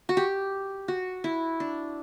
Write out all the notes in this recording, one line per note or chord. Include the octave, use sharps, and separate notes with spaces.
F#4
G4
F#4
E4
D4